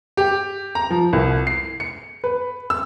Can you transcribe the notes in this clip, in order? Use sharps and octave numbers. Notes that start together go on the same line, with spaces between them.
G4
A#5
F3
C2
C7
C#7
B4
E6